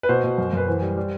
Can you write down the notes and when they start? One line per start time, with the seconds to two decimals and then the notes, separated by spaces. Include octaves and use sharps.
0.03 B4
0.09 B2 C5
0.24 B2
0.38 F#2
0.53 F#2 B4
0.68 E3 C5
0.82 G3
0.97 G3